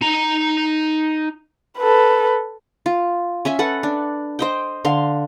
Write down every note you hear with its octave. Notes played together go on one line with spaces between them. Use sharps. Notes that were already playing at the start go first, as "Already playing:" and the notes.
D#4 A#5
A4 B4
F4
C#4 E5 G#5
A4 B4 F#5
D4
C5 D#5 G5
D3 F5 C6